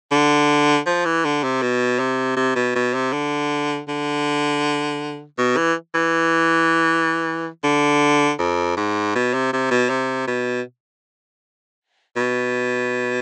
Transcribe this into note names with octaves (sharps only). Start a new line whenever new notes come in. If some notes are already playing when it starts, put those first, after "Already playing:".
D3
F3
E3
D3
C3
B2
C3
C3
B2
B2
C3
D3
D3
B2
E3
E3
D3
F2
G#2
B2
C3
C3
B2
C3
B2
B2